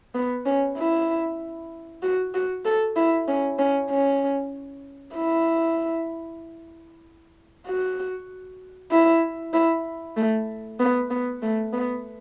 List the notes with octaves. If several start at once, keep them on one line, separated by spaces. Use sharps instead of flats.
B3
C#4
E4
F#4
F#4
A4
E4
C#4
C#4
C#4
E4
F#4
E4
E4
A3
B3
B3
A3
B3